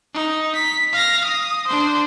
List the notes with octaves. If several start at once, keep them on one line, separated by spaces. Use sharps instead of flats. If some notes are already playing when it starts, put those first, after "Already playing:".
D#4
B6
F5 A#6
D#6
D4 C5